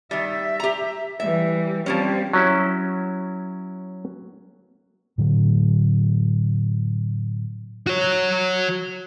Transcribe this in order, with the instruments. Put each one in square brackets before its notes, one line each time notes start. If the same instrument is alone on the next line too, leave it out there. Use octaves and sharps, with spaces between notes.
[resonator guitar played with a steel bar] D#3 G3 [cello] E5
[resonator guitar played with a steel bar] G4 A#5
[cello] E3 G3 [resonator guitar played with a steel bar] E5
[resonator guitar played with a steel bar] F3 A#3 C#4 [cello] G3 C4
[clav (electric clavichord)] F#3 C#4 E4
[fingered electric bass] A2 D3 F#3
[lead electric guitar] F#4 C#5